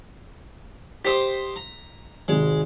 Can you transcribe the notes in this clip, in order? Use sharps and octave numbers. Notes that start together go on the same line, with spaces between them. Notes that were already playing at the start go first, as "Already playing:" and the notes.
G4 C5 D#5 B6
A#5
G#1 C3 D#3 G#3